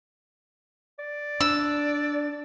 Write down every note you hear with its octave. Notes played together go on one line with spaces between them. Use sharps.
D5
D4 E6